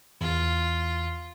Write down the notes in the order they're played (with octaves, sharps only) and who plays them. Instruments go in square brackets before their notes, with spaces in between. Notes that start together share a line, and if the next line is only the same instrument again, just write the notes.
[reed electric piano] E2 [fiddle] F4